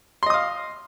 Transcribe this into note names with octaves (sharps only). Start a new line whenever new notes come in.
D#5 F5 C6 D#6